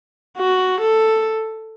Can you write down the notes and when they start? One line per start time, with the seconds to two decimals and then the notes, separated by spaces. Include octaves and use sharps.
0.38 F#4
0.81 A4